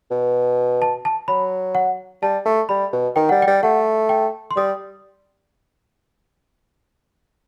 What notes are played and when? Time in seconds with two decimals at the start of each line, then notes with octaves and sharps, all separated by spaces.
0.11 B2
0.82 A5
1.05 A5
1.28 F#3 B5
1.75 F#5
2.22 G3 A5
2.45 A3
2.69 G3 B5
2.93 B2
3.16 D#3 G5
3.29 G3 F#5
3.42 G5
3.47 G3
3.63 A3 F#5
4.09 G5
4.51 C6
4.56 G3 D#6